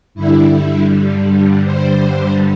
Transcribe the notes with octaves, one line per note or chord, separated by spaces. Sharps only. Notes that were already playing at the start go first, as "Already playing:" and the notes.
G2 D3 G3 E4
C5